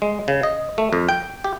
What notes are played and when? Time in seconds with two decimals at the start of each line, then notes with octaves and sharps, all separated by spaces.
0.02 G#3
0.28 C#3
0.43 D#5
0.78 A3
0.93 F2
1.09 G5
1.44 G4